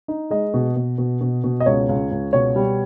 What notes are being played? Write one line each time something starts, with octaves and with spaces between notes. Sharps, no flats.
D#4
G#3 D#5
B2
B2
B2
B2
B2
D#5
C#2 C#5
C#2
C#2
B2 C#5
G3